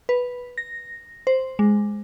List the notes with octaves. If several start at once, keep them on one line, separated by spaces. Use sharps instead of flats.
B4
A#6
C5
G#3